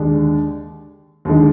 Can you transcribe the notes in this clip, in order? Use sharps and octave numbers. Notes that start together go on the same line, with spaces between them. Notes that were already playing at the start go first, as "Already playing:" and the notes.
Already playing: D#2 D3 G#3 D4
D#2 D3 G#3 D#4